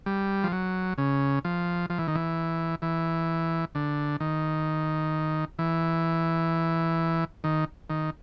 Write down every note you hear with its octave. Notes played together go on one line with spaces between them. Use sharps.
G3
F3
F#3
C#3
F3
F3
E3
D#3
E3
E3
D3
D#3
E3
D#3
D#3